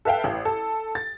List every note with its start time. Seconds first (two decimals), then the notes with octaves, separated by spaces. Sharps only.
0.05 A4 B4 E5 F5 G5
0.24 A1
0.45 A4
0.95 A6